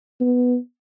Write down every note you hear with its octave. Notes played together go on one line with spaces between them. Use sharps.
B3